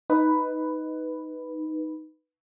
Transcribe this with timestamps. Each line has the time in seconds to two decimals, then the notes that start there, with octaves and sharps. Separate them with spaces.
0.10 D#4 B4